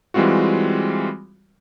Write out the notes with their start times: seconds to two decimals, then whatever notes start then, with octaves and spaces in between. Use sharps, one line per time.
0.14 E3 G3 G#3 C4 F4 F#4